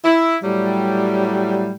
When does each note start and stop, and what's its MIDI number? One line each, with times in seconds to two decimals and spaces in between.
0.05 0.38 64
0.43 1.75 45
0.43 1.75 54
0.43 1.75 55